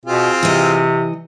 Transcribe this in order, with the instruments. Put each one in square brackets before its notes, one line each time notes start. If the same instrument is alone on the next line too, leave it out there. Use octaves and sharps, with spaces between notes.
[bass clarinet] B2 [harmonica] C4 F4 G#4
[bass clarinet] C3 [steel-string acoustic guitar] E3 D#5